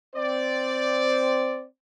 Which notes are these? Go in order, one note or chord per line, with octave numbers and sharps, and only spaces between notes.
C4 C5 D5